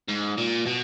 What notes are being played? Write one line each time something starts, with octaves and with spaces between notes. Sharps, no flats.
G#2
A#2
B2